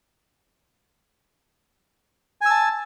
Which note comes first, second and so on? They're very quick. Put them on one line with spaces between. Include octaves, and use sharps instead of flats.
G#5 E6 A5